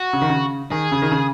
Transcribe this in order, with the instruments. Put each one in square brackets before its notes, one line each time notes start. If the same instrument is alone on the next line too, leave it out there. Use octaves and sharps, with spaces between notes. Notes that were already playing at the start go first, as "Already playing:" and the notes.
Already playing: [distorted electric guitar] F#4
[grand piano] C#3
D#3
C#3
[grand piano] D#3 [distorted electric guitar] G#4
[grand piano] C#3
D#3
C#3